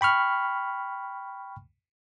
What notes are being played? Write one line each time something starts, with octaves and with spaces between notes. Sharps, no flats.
G5 B5 C#6 F6